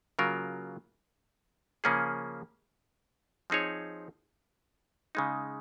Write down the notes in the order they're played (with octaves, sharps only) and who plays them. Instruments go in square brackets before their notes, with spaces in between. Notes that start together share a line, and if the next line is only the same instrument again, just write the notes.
[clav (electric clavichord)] C#3 F#3 A#3 F4 A#4
C#3 F3 A#3 C#4 G#4
F3 C4 D#4 G#4 C#5
C#3 G#3 D#4